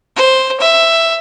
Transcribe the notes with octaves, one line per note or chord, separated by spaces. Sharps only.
C5
E5